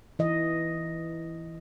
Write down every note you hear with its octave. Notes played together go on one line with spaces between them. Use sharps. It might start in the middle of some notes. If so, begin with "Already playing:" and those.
E3 D#5